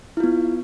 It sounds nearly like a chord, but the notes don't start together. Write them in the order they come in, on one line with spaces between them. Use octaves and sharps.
E4 F4 B3